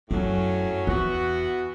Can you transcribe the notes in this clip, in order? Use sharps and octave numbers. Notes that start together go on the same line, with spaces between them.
F#2 A2 F#3 C#4
E2 E3 B3 F#4